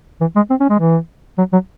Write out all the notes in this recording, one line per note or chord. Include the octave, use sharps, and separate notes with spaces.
E3
G#3
C4
C#4
G#3
E3
F#3
F#3